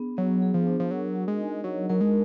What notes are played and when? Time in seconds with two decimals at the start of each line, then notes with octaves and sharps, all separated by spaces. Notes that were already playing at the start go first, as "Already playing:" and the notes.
Already playing: B3 D4 G#4
0.17 F#3 B3
0.42 G#4
0.54 F3
0.67 D4
0.80 F3
0.91 F#3 A#4
1.16 F#4
1.28 G#3
1.40 D#4
1.64 F#3 D#5
1.89 F#3 A#4
2.01 G#3